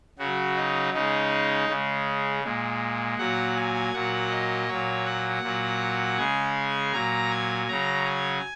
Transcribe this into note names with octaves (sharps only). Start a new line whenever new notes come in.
C#3 F#3 F#4
D#4
C#3 G#3 D#4
C#3 G#3
A#2 G#3
A#2 F#3 F#5
G#5
A#2 F#3 F#5
D#5
A#2 F#3 C#5
F#5
A#2 F#3
C#3 G#3 G#5
A#2 F#3 A#5
G#5
C#3 F#3 A#5
G#5